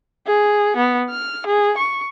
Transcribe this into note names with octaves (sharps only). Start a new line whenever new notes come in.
G#4
B3
F6
G#4
C#6